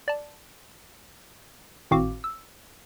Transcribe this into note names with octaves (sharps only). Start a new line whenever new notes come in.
D5 A5
G#1 A2 C4 F#4 F5 D6
E6